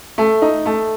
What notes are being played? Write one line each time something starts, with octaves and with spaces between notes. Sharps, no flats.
A3
D#4
A3